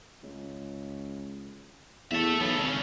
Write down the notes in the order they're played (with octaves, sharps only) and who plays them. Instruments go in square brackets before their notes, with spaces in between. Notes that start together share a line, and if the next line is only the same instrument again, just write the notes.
[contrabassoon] C#2
[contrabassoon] E2 [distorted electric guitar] A4 E5
[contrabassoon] B1 [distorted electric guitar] B3 A4
[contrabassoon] G#1 [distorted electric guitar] C#3 C#4